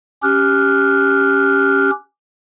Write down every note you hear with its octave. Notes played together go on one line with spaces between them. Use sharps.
C#4 G4 F6 F#6